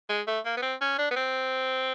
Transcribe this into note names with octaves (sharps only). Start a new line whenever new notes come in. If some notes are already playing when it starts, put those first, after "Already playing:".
G#3
A3
A#3
B3
C4
C#4
D4
B3
C4